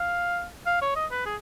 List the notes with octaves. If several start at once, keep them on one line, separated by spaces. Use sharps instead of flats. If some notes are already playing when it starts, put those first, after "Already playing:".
Already playing: F5
F5
C#5
D#5
B4
G#4